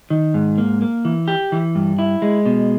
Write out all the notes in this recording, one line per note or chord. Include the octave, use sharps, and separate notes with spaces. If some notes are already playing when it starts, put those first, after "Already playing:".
D#3
G#2
A#3
A#3
E3
G4
E3
G2
E4
G#3
B2